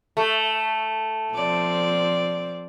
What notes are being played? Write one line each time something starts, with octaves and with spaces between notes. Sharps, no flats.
A3
F3 C4 D5